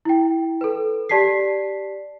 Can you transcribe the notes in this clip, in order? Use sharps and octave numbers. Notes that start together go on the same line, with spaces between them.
E4 G5
A4 B4
G4 D5 A5 B6 C7